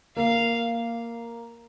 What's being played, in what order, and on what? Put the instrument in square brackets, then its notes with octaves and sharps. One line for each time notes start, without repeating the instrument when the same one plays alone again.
[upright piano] A#3 [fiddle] F5